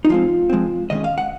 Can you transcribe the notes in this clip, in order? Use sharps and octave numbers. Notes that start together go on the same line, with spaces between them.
D#4
F3 G#3 C4 F4
F3 G#3 C4
D#3 G#3 C#4 D#5
F5
F#5